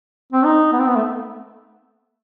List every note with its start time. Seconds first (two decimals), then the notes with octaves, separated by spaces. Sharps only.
0.33 C4
0.45 D#4
0.73 B3
0.79 C4
0.88 B3
0.96 A3